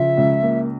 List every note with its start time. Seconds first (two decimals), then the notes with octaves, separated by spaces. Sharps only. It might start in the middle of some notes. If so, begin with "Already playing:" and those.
Already playing: C#3 F3 E5
0.17 C#2
0.42 A#3